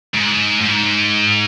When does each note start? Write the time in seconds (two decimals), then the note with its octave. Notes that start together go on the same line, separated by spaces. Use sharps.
0.14 G#2
0.61 G#2